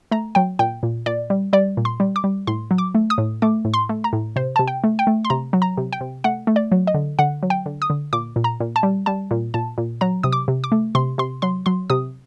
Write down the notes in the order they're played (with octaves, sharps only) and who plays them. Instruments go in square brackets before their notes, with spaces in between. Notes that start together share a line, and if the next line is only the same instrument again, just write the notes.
[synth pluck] A3 A#5
F#3 G5
A#2 G5
A#2
A#2 D5
G3
G3 D5
A#2
C6
G3
D6
G3
A2 C6
F#3
D6
A3
D#6
A2
A3 D6
A2
C6
A3
A#5
A2
C3 C5
C3 A5
G5
A3
G5
A3
C6
C3 A#5
F#3
A#5
C3
G5
C3
A3 F#5
A3
D5
F#3
D#5
D3
D3 F#5
F#3
G5
D3
D#6
D3
A#2 D6
A#2
A#5
A#2
A5
G3
G3 A5
A#2
A#2 A5
A#2
F#3 A#5
C3 D#6
D6
C3
D6
A3
C3 C6
C3 C6
F#3 C6
F#3 C6
C3 D#6